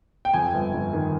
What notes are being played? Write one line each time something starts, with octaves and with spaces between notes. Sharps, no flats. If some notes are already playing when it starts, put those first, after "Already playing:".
G5
F2 G#5
G1
G1
D#3